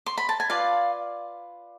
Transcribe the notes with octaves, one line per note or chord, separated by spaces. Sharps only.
C6
B5
A5
G#5
F4 B4 D5 F5